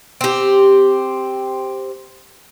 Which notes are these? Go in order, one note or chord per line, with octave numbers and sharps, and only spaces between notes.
C4 G4